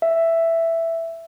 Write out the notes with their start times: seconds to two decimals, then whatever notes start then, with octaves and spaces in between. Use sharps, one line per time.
0.02 E5